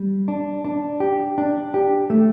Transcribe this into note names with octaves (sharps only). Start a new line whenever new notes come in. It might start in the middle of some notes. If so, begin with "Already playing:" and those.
Already playing: G3
D4
D4
G4
D4
G4
A3